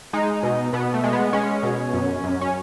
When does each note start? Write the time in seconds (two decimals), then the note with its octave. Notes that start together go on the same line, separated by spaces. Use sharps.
0.13 G#3 D#4
0.43 B2
0.73 B2 B3
0.94 A3
1.04 G#3
1.13 B3
1.33 G#3 C#4
1.63 B2
1.93 F#2
2.24 F#2
2.41 C#4